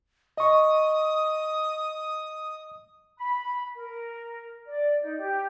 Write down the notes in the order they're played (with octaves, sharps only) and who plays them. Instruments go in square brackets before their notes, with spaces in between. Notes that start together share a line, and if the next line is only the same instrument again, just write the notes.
[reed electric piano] D#5 C#6 [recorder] D#6
[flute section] B5
A#4
D5
D#4
G4